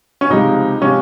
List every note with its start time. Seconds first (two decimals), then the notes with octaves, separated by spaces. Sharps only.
0.21 C#4
0.30 C#2 C3 F3 G#3 D#4
0.81 C3 F3 G#3 C#4